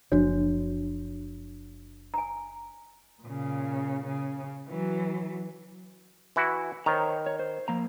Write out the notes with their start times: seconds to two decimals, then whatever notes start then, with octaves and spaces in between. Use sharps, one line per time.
0.12 F#1 F3 D4 F#4 C#5
2.14 G#5 A#5
3.22 A#2 C#3
4.04 C#3
4.68 E3 F#3
6.36 E3 E4 F#4
6.86 D#3 C5 C#5 A#5
7.27 C#5
7.39 C5
7.68 F3 A#3 A#5